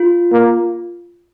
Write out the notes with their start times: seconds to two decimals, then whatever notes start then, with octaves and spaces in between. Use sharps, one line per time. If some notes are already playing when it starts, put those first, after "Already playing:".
Already playing: F4
0.32 A#3